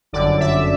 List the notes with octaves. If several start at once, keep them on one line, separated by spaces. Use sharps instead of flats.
G1 F#2 D3 D5
E5